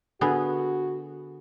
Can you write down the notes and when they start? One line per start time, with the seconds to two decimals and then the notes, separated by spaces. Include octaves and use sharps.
0.21 D3 B3 F#4 G#4